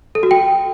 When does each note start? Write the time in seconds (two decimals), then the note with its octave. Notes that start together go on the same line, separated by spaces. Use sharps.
0.15 A4
0.23 F#4
0.31 G5